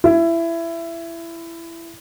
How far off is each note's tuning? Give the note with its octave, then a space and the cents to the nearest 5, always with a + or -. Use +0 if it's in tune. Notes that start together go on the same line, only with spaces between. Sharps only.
E4 +20